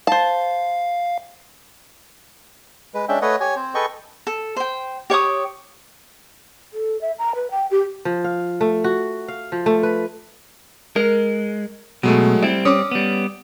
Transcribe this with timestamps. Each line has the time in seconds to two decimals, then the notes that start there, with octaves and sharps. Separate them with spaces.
0.07 C5 F5 A5
2.94 G#3 B4
3.08 G#3 C#4 D4 E5 G5
3.22 A3 B4 C#5 D#5 F#5
3.40 G4 C#5 G#5
3.56 C4 C5
3.75 G#4 A4 B4 D#5 G5 C#6
4.27 A4
4.56 C5 G5
5.10 G4 C#5 C#6 D#6
6.73 A4
7.01 E5
7.19 A#5
7.35 B4
7.51 G5
7.71 G4
8.05 F3
8.24 F5
8.61 A3
8.84 F#4
9.28 F5
9.52 F3
9.66 A3
9.83 B4
10.96 G#3 A#4
12.03 B2 F#3 G#3 A3
12.43 G3 C4 E4
12.65 C#4 D6 D#6
12.91 G3 B3